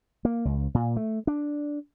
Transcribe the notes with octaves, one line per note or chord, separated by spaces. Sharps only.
A#3
C#2
A#2
A3
D4